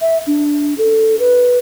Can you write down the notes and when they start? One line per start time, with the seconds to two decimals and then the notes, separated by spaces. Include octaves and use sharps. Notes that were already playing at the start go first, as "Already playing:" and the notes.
0.01 E5
0.27 D4
0.78 A4
1.19 B4